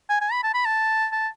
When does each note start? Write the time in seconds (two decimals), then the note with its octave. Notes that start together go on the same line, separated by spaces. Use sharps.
0.09 G#5
0.21 G#5
0.32 B5
0.43 A5
0.54 B5
0.66 A5
1.12 A5